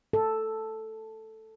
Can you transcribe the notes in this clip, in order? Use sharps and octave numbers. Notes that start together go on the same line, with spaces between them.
A4